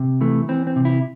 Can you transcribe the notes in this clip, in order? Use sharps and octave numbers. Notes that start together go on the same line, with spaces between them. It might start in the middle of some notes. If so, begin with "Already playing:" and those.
Already playing: C3
E3 A3
E3 C4
C4
C3
E4